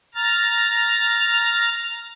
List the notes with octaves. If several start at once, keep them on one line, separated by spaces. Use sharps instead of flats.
A#5 F6 A6